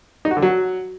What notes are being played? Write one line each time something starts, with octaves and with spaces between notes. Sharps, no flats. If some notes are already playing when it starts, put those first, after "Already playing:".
D#4
F#4
D3
F#3